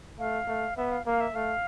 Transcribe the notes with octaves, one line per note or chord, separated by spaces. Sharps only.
A3 F5
A3
B3 E5
F5
A#3 F5
E5
A3 F5